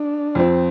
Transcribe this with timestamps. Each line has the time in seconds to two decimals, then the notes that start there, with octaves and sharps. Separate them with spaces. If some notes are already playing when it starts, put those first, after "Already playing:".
Already playing: D4
0.35 F2 F3 C4